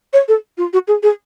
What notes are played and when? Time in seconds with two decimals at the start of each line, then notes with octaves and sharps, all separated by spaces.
0.13 C#5
0.28 A4
0.58 F4
0.73 F#4
0.88 G#4
1.03 G#4